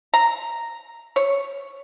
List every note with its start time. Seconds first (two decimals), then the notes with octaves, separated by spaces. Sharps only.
0.14 A#5
1.16 C#5